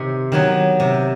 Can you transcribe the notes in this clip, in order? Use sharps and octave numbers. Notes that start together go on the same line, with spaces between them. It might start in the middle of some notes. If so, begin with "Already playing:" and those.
Already playing: C3 D#3 D#4
D#3 F#3 B3 D#4
C3